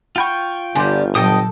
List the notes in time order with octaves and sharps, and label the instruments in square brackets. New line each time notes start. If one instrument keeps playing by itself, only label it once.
[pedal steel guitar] F4 G5 C#6 [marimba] F#5 B5
[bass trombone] G1 [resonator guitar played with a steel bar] D3 G3 [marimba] G#5 C6 D6
[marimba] A#2 F#3 [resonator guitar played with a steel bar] A4 [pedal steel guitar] D#5 G5 D#6